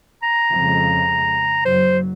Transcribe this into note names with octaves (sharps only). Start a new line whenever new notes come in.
A#5
F2 C#3 G#3
F#1 F#3 C5